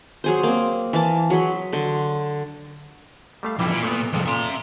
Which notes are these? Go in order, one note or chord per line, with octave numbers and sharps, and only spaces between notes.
F#3 G#4 C5
A#3 C4
E3 F5 A5
F#3 G#4 B5 C6
D3 C6
G3 A3 F5
B1 F2 E3 G3 E4
A#2
A3 B3
C2 F2 G#3 A4
A#2 A4 E5 C6